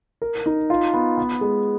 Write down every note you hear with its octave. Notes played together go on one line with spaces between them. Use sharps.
A#4
D#4
F4
B3
B3
G#3